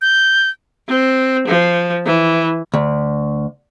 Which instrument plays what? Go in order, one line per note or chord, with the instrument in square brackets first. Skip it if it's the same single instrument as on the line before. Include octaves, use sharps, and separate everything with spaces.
[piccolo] G6
[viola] C4
F3
E3
[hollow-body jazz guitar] D2